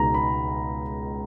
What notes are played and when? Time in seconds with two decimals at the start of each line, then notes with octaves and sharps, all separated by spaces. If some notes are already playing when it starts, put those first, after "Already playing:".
Already playing: C#2 B2 G#3 B3 D#4 A#5
0.14 B5